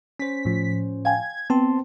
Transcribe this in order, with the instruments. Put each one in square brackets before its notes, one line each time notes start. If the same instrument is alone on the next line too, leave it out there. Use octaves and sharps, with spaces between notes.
[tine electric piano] C#4 C5 [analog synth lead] B6
[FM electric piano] A2 F3
[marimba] F5 G5 G#5 [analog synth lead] G#6
[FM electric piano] B3 [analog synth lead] C4 [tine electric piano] A5 C6